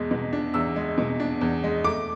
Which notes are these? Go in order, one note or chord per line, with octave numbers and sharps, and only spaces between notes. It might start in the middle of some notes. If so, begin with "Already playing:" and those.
Already playing: E2 B2 G#3
B2
D4
E2 E6
G#3
B2
D4
E2
G#3
A3 D6